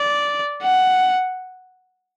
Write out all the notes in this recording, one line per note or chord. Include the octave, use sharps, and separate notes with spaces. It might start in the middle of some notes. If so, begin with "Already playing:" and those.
Already playing: D5
F#5